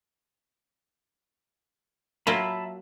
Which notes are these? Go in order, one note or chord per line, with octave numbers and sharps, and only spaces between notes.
F#3 A#3 F4 E5 A5 B5